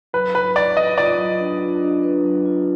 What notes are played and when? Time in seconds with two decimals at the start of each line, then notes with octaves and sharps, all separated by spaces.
0.14 F#3 B4
0.35 F#3 B4
0.56 B4 D5
0.76 B4 D#5
0.97 F4 D5
1.18 F#3
1.39 D4
1.61 F4
1.83 D4
2.03 B4
2.24 F#3
2.45 F4